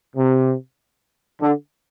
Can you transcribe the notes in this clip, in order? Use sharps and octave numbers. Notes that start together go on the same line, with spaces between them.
C3
D3